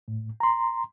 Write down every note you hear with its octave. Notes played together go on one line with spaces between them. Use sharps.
A2
A#5 C6